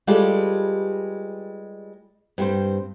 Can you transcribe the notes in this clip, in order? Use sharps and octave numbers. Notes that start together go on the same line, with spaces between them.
G3 G#3 F4 G4 A4 B4
G2 C4 C5